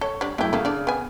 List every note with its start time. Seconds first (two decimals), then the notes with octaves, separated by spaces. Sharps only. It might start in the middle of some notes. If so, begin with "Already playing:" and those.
0.01 A4 C#5
0.21 G3 D4
0.38 F#2 G#3 A3 E4 G4
0.53 C#3 A3 A#3
0.65 D4 D5
0.87 B3 G#5